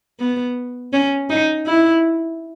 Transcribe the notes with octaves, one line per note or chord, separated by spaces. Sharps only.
B3
C#4
D#4
E4